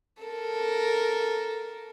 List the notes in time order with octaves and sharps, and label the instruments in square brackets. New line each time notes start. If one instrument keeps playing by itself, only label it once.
[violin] A4 A#4